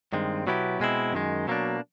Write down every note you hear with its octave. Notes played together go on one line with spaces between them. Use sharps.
G2 D#3 G#3 C4
B2 F#3 B3 E4 G4
B2 G#3 C4 E4
F#2 D#3 G#3
B2 F#3 A#3 D4